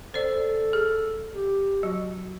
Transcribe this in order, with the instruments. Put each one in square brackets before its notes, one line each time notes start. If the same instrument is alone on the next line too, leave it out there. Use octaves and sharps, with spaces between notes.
[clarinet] A4 [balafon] C5 D5
[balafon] G#4
[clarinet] G4
[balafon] F#3 [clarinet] F#4